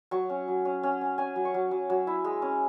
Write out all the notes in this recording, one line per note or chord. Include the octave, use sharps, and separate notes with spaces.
F#3 C#6
C#4
F#3
C#4
C#4
C#4
C#4 G#5
F#3
C#6
F#3
F#3
F#3
E4
G#3
C#4